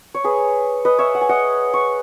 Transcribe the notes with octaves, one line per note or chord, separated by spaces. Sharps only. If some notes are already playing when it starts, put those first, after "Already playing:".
C#5
G#4 B4
B4 D#5
C#5 E5
F#5
G#5
D#5 F#5
C#6